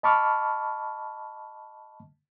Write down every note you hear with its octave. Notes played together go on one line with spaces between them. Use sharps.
D#5 A5 B5 C#6 D6 F6